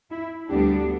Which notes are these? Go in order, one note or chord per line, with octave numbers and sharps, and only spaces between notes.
E4
D2 D3 G3 B3 D4 G4